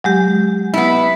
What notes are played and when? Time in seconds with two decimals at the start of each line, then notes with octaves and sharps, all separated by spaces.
0.04 F#3 G#3 G4
0.74 B3 E4